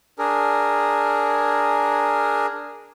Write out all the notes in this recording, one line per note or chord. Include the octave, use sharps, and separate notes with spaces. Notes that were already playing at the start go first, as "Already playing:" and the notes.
D4 G#4 A#4